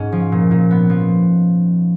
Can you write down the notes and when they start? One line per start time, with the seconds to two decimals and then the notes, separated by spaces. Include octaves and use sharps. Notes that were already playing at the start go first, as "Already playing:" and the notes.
Already playing: G#2 C#4
0.12 F3
0.32 A#2
0.51 A#2
0.71 B3
0.90 F3